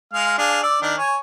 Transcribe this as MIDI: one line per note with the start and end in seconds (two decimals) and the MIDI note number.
0.13 0.38 56
0.13 0.38 77
0.13 0.38 89
0.38 0.60 62
0.38 0.60 68
0.38 0.60 77
0.63 0.77 74
0.63 0.77 88
0.82 0.95 51
0.82 0.95 62
0.97 1.17 73
0.97 1.17 80